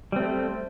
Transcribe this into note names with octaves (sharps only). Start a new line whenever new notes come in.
G3 A3 C4